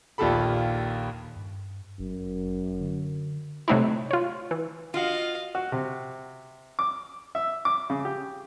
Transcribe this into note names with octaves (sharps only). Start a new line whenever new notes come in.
A#1 D#2 F4 G4 A4 B5
G2
G1 F#2
D3
C3 F#3 A3 C4 D#4 E4
F4 C#5
E3
F4 F#4 D#5 F5
F#4
C3
D6
E5
D6
C#3
G4